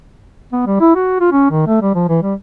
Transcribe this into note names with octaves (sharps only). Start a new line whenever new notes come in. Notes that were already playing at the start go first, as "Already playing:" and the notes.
B3
G3
E4
F#4
F4
C#4
D#3
A3
G3
F3
E3
G3